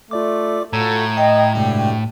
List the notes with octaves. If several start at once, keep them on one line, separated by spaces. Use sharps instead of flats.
A3 F4 D5 D6
A2 F4 F#4 A4 A#5 G#6
D#5 G5
D2 G2 C3 G#3 D4 G4